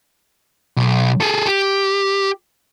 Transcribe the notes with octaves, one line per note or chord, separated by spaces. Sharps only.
B1
G#4 A4
G4